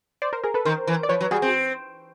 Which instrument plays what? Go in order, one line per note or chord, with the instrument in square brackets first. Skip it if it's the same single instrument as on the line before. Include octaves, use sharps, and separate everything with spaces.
[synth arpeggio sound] C5 D5
A#4 C5
G#4 A#4
A4 B4
[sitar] D#3 [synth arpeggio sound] A#4 C5
[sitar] E3
[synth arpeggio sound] D5
[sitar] F3 [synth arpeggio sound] B4 C#5
[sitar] F#3
[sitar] G3 [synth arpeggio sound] F#4 G#4
[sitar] C4